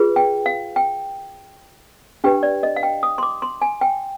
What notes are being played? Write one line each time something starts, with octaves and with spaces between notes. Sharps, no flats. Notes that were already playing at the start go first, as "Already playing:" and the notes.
Already playing: F4 G#4 B4
G5
F5
G5
D4 G4 B4 G5
D5
D#5
F5
G5
D#6
C6
D6
C6
G#5
G5